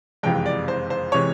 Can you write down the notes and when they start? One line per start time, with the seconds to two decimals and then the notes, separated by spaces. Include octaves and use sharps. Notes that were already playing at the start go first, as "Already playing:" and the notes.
0.23 F#1 F2 C3 E3 G#3 G5
0.46 D5
0.68 C5
0.90 C5
1.12 C3 E3 G#3 C#5